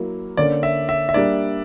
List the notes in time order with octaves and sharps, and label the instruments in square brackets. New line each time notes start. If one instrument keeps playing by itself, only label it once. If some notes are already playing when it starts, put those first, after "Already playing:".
Already playing: [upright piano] F#3 A#3 E4 A#4
[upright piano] D3 A#3 C#4 [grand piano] D5
[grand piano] E5
E5
E5
[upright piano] G3 A#3 D4 [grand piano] D5